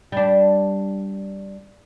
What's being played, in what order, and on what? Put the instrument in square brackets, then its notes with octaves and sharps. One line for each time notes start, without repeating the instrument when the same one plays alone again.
[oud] G3 D4